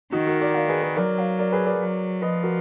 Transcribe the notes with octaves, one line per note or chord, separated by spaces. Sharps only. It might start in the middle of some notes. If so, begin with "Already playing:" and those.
D#3 D#4 F#4
F#4 A#4
A#4 D5
D5 F5
G#4 B4
G#4 B4
F#3 A#4 D5
D5 F5
A#4 D5
G#4 B4
A#4 D5
F#3
F3 B4 D#5
F#4 A#4